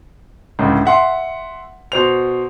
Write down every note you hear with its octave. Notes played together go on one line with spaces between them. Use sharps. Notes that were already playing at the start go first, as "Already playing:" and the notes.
C#2 A2 D3
E5 F#5 C6
B2 C5 F7